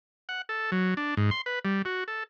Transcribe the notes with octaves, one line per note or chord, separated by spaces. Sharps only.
F#5
A4
F#3
D4
G#2
C6
B4
G3
F#4
A4